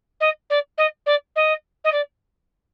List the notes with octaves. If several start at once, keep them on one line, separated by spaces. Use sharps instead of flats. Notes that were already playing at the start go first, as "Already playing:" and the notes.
D#5
D5
D#5
D5
D#5
D#5
D5